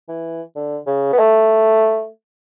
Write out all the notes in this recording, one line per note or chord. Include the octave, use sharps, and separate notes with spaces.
E3
D3
C#3
B3
A3